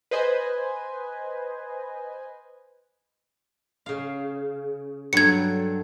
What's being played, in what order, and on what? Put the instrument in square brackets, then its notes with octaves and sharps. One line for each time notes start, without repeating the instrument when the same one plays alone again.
[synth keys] B4 C5 D#5 G#5
[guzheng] C#3 F5
[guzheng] G2 F#3 A4 [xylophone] G#6 C#7